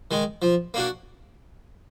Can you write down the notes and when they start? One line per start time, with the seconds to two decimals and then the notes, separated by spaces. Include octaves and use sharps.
0.11 D#3 G#3
0.42 F3
0.74 A#3 D4 F#4